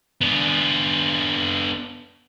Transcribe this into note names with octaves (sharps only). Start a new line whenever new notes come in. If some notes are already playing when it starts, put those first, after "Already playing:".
B3 D4